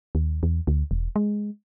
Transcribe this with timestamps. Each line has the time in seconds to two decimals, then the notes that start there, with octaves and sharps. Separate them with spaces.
0.15 D#2
0.43 E2
0.67 D2
0.91 E1
1.16 G#3